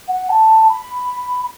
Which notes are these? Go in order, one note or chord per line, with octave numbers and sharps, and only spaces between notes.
F#5
A5
B5